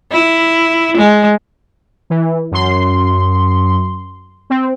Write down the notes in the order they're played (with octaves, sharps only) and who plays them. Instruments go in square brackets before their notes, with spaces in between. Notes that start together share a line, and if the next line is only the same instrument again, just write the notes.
[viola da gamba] E4
G#3
[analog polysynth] E3
F#2 C6
C4